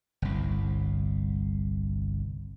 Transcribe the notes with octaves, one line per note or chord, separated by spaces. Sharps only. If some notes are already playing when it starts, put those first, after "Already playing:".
G1 C2